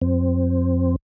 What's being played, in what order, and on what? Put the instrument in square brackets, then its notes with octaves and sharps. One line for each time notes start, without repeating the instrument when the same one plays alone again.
[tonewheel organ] F2 C4